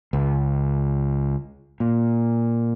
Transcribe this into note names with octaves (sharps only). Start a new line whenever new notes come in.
C#2
A#2